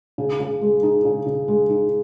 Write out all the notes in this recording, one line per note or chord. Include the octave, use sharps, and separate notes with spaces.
C#3
C#3
G#3
D#4
C#3
C#3
G#3
D#4